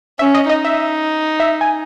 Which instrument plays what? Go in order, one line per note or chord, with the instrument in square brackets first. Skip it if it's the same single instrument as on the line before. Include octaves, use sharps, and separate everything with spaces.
[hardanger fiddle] C#4 [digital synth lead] E5
[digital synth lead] D#5
[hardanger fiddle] D#4 [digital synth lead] D#5
[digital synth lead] E5
E5
G#5